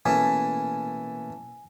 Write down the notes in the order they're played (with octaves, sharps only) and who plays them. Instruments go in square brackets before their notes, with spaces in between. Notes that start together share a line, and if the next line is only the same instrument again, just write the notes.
[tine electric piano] B2 A#3 A5 [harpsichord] E3 A3 C#4 [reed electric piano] G#5